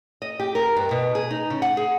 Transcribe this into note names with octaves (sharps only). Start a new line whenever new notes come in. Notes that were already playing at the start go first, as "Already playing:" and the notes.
D#5
G4
A#4
G2
B2
G#4
D#4
C#3
F#5
G#4